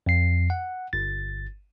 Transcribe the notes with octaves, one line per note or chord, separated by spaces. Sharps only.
F2 C7
F#5
G1 A6